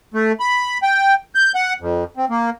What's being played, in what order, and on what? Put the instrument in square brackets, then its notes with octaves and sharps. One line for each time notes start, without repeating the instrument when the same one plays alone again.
[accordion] A3
B5
G5
G6
F#5
F2
C4
A#3